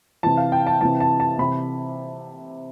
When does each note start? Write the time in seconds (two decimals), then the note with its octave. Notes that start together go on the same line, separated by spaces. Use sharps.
0.23 C3 E3 A5
0.37 F5
0.52 G5
0.67 A5
0.81 C3 E3 A5
1.00 A5
1.20 A5
1.39 C3 E3 B5